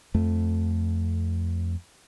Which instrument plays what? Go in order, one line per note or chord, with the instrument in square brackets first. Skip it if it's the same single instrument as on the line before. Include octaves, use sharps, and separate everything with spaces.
[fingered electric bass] F2 A3